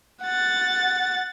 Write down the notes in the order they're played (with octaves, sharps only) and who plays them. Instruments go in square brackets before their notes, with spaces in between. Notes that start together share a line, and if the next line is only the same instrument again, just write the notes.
[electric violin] F#5 A6